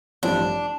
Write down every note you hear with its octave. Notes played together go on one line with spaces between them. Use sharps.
A1 G2 F3 C4 D4